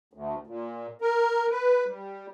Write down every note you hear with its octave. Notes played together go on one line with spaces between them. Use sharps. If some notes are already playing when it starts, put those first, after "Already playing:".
D2
A#2
A#4
B4
G3